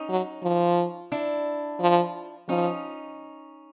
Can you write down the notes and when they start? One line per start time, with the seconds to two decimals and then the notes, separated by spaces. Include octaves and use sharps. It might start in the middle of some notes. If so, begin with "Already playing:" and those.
Already playing: C#4 D#4
0.10 F#3
0.43 F3
1.12 D4 E4
1.80 F3
2.49 F3 C#4 D#4